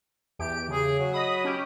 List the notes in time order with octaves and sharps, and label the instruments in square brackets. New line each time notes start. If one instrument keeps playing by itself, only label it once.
[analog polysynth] E2 G4 D7
[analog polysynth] C#3 [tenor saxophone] G#4
[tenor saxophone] F#3
[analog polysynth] D#5 B5 D#6
C#4 G4